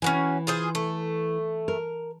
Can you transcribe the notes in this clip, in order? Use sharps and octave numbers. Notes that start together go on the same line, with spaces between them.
E3 C#4 F#4 G#5
F4 G#4 C5
A3
A#4